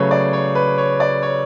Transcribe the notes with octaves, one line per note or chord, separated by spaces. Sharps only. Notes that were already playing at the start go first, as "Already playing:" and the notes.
Already playing: C#3 F#3 A3 B4 C#5
D5
C#5
B4
C#5
D5
C#5